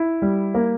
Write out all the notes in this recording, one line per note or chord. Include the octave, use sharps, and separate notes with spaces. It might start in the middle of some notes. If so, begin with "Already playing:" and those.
Already playing: E4
G3
A#3